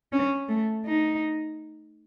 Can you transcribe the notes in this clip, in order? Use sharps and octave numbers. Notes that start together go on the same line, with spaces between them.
C#4
A3
D#4